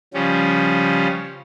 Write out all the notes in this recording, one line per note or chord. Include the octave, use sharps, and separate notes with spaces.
C#3 F3 G3 C#4